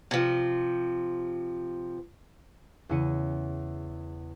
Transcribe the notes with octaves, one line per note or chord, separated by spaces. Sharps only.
C3 F3
E2 C#3 E4 C#7 D#7